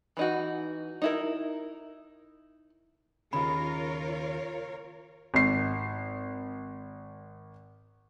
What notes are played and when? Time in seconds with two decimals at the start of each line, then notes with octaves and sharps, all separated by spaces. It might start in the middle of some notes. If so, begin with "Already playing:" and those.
0.17 E3 D#4 F#4
1.02 D#4 E4 A#4
3.33 D#2 C#3 F4 G#4 A#4 C#5 B5
5.34 G#1 C7